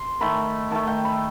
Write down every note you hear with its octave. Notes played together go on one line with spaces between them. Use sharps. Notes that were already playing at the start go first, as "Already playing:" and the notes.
Already playing: C6
D#3 A3 B5
D#3 A3 A5
G5
B5